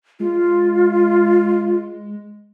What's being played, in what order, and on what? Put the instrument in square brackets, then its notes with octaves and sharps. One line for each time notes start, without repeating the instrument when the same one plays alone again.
[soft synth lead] G#3 [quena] F4